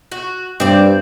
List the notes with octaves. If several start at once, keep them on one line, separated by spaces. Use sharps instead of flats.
F#4
G2 C4 D5